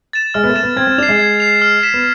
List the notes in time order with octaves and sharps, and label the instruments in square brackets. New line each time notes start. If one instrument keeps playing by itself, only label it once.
[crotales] A6 E7
[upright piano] G#3 [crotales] F6
[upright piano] B3
A3
[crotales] A6 E7
[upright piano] B3
[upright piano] C4 [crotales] G#6
[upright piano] C4
[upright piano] D4 [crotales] C7 F7
[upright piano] G#3
[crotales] G#6
C7 F7
F6
B6 E7
[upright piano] B3